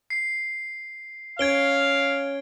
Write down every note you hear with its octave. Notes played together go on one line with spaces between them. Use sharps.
C7
C#4 F5 G#6 D7 G7